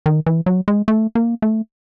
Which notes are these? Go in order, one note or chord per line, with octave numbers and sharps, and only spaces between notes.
D#3
E3
F#3
G#3
A3
A#3
A3